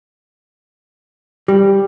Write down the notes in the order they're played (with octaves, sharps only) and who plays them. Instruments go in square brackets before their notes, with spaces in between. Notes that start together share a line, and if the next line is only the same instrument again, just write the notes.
[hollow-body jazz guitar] G3 [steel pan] G4